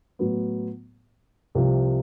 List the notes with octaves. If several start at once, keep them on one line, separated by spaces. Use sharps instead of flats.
A2 F#3 B3
C2 C3 F3